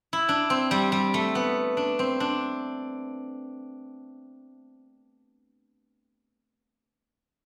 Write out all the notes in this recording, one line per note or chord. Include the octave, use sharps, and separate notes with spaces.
E4
D4
C4
G3
G3
A3
B3
D4
C4
D4